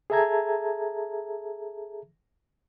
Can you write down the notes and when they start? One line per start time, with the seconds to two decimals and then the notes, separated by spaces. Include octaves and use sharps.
0.10 G#4 A4 E5 A5 A#5 G#6